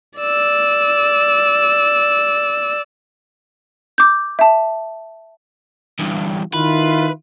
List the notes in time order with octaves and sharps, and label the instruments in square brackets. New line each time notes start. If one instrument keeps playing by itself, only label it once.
[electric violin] D5 E6
[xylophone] D6 G6
E5 A5
[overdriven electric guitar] E2 G2
[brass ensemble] D#3 E4 F4 [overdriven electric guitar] B4